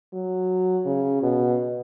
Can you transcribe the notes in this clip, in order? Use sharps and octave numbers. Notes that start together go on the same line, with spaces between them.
F#3
C#3
B2